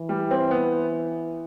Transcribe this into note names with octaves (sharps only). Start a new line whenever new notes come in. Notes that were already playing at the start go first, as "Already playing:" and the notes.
Already playing: E3
G3
C4
B3